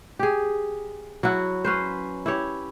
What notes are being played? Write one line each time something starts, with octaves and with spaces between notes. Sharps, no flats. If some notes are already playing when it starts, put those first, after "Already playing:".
G4 G#4
F#3 E4 F#4
C#4 B4 C5
E4 G4 C#5